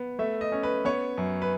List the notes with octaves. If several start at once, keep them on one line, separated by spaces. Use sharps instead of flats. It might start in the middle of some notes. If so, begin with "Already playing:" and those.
Already playing: B3
A3 E5
D#5
C#4
B4
B3 C#5
F#2
B4